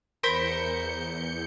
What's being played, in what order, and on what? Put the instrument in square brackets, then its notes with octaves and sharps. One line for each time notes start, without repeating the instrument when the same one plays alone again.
[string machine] E2 G6 C#7 [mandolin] A#4 C5 B5